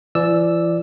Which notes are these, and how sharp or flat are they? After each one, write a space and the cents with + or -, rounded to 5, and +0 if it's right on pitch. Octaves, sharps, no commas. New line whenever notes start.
E3 +45 D5 +0 E6 +0